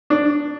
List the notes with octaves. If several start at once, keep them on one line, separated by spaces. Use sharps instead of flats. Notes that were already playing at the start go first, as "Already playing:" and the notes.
D4